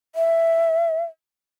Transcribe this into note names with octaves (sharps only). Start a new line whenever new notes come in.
E5